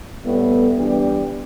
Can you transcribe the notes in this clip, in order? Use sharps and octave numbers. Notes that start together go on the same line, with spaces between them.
A2 G3 B3
E3 G3 B3 D4 G4